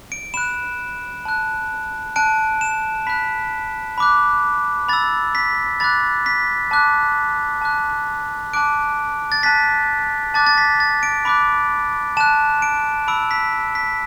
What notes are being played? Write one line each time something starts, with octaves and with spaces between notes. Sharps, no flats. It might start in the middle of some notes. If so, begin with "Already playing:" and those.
D7
B5 F#6 E7
A5 F#6
A5 F#6 D7
E7
B5 F#6 B6
B5 D6 F#6
B5 E6 A6
B6
B5 D6 F#6 A6
B6
A5 D6 F#6
A5 D6 F#6
A5 D6 F#6 D7
A6
A5 F#6 B6
A5 D6 F#6 A6
A6
B6
A6
D7
B5 D6 F#6 D7
A5 F#6 E7
D7
B5 E6 D7
B6
B6